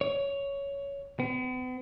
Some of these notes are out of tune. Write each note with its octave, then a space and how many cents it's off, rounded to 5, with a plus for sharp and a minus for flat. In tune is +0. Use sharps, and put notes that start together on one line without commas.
C#5 +10
B3 +45